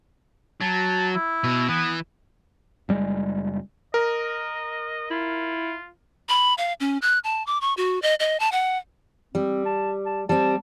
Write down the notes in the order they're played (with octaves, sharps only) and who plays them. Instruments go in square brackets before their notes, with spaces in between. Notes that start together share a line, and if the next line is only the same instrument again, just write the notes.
[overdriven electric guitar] F#3 [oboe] A5
[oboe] E4
[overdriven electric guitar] B2
[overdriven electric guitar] E3 [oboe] B3
[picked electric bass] F#1 G3 G#3
[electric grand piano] A#4 [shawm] D#5
[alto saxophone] E4 [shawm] F4
[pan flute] B5
F5
C#4
F#6
A5
D6
C#6
F#4
D#5
D#5
A5
F#5
[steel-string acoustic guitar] G3 [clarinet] C4
[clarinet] A5
A5
[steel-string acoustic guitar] G3 C4 [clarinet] A5